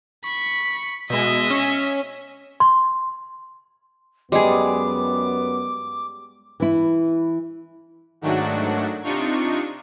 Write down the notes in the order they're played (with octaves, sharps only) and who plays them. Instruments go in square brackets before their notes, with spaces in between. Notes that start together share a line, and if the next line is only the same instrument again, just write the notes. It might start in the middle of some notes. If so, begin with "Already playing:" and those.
[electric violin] B5 [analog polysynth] C#6
[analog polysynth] B2 G#3 [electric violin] D#5 E5
[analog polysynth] C#4
[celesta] C6
[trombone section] F#2 B3 [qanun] G3 G#4 [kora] G#3 [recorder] D6
[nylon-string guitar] E3 E4
[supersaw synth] G#2 D#3 F#3 A3 D4 F#4
C3 D4 D#4 F4 C#6